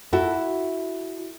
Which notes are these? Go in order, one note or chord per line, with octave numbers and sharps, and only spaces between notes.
E4 F#4 A4